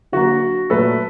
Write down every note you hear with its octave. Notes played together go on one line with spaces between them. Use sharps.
D3 F#3 A#3 F#4
A#2 F#3 A3 A4 B4